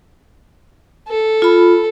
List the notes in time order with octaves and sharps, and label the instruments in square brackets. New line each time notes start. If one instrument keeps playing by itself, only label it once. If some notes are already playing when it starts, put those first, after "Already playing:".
[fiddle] A4
[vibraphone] F4 B5